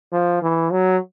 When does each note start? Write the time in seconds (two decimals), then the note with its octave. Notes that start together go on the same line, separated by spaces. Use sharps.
0.12 F3
0.42 E3
0.71 F#3